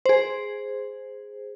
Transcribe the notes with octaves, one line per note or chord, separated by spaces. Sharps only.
G#4 C5